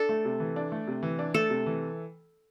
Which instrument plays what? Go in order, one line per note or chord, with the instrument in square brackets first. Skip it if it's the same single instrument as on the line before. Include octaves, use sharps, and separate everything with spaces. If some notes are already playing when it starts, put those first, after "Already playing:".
Already playing: [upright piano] D4 [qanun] A4
[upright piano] A3
C3
E3
D4
A3
C3
E3
D4
[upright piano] A3 [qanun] A4
[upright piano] C3
E3